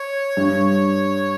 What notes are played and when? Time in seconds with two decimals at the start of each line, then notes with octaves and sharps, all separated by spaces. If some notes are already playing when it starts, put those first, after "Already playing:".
Already playing: C#5
0.37 G2